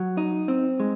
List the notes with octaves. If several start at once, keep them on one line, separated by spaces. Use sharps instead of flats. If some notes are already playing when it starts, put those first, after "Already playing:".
Already playing: F#3
D#4
C4
G#3